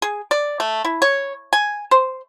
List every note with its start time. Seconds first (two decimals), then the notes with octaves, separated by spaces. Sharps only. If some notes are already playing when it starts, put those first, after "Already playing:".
0.02 G#4
0.31 D5
0.60 A3
0.85 E4
1.02 C#5
1.53 G#5
1.91 C5